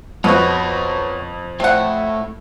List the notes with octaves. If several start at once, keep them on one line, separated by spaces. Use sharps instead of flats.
F2 B3 F#4 B4 C#5
A3 C4 E4 F#5